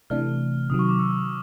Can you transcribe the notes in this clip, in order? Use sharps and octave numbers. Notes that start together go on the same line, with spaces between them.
C3 E3 A3 D4 F6
C3 D#3 F#3 D#6
C#6
D6
E6